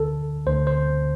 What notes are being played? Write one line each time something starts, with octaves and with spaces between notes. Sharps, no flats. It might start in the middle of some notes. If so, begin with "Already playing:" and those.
Already playing: D2 D3 A4
D2 D3 C5
C5